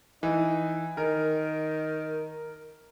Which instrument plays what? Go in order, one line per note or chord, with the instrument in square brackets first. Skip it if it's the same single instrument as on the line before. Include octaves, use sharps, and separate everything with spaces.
[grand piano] E3 [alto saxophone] D#4
[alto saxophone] D#3 [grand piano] A#4